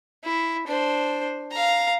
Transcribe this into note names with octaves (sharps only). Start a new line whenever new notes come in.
E4
D4 C5
F5 A#5